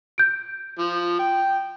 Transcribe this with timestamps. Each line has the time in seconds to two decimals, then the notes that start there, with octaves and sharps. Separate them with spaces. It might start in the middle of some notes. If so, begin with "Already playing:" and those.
0.18 G6 D7
0.79 F3
1.19 G5